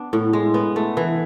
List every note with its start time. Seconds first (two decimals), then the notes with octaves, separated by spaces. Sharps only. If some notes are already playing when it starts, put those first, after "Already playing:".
Already playing: B3 D4
0.13 A2
0.33 G#3
0.54 B3
0.76 A3
0.97 E3